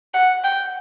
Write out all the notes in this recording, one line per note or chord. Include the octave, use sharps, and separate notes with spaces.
F#5
G5